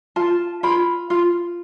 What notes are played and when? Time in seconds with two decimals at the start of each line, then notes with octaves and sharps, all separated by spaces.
0.16 F4 A5
0.63 F4 B5
1.10 F4